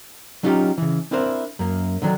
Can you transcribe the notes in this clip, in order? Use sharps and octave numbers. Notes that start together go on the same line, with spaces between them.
F#3 C#4 D#4 F4 G4
C#3 E3
C4 D4 E4 A#4 C5
F#2 A#3
D3 D#3 F#3 D4